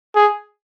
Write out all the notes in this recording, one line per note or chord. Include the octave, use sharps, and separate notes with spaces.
G#4